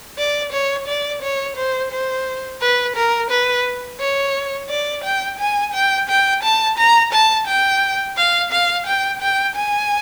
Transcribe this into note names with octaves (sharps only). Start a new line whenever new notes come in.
D5
C#5
D5
C#5
C5
C5
B4
A#4
B4
C#5
D5
G5
G#5
G5
G5
A5
A#5
A5
G5
F5
F5
G5
G5
G#5